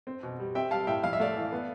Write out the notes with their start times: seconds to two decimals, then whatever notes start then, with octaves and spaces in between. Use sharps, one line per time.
0.07 C4
0.23 B2
0.40 G3
0.55 C4 E5 G5
0.71 G3 F5 A5
0.87 A2 E5 G5
1.03 F2 F5
1.13 E5
1.20 A3 D5 F5
1.36 E3
1.52 B3